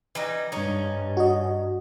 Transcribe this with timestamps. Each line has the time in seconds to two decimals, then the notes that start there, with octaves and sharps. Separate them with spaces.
0.15 E3 G3 D#4
0.52 G2 C#4 D#4
1.17 F#4 D#5